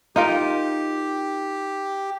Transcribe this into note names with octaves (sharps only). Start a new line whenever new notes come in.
D#4 F4 G4 A#4